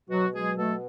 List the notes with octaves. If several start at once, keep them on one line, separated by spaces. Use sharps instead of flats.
B2 F#3 F#4
F#3 G#3 G#4
B2 A3 A4